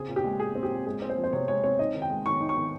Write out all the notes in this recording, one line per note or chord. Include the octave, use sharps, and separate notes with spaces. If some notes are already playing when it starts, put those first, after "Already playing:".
Already playing: C#3 C4 G#4
A#2
G4
G#3
A#2 G#4
C4
G4
A#2
G#3 G#4
C4
C5
F3
C5
C3 C#5
G#3 C#5
C4 C#5
D#4 D#5
D#3
G5
G#3
D#3 C#6
D#4
C#6
D#3